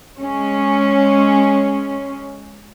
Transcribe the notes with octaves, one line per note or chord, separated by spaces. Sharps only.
G#3 C#4